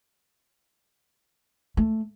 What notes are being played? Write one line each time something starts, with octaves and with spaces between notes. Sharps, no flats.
A3